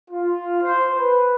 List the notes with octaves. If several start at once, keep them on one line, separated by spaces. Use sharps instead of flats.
F4
C5
B4